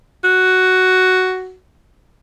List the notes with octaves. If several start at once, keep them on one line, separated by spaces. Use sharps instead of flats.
F#4